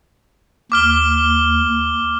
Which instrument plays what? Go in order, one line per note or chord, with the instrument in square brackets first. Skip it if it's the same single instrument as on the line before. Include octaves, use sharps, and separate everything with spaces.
[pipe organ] D#2 [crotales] D6 F6 G7